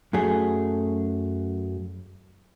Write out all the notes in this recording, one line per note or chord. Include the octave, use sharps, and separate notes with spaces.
F#2 F#3 A3 G#4